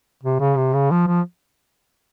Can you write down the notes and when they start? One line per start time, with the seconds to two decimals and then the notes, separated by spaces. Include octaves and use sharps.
0.23 C3
0.40 C#3
0.57 C3
0.74 C#3
0.91 F3
1.07 F3